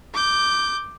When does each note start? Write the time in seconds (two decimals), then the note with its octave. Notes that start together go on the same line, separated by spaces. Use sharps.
0.14 D6 G6